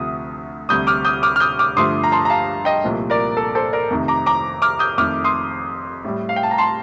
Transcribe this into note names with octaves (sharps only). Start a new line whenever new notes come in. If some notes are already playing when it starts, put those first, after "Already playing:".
Already playing: D2 C3 F3 A3 D#6
D2 C3 G3 D#6 G6
D6 F6
D#6 G6
D6 F6
F6
D#6 G6
D6 F6
G2 D3 F3 A3 C6 D#6
A#5
A5 C6
A#5
F5 A5
D#5 G5
C2 A#2 F3 A3
A#4 D5
A4
A4 C5
A#4 D5
F2 C3 D#3 A3
A#5 D6
A#5 D6
D6 F6
D#6 G6
F2 D#3 A3 D6 F6
C6 D#6
A2 G3
F5
G5
A5
A#5
A5 C6